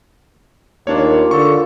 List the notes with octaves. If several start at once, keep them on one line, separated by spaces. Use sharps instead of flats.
D#2 A#3 D4 F4 C#5
D3 A4 C#6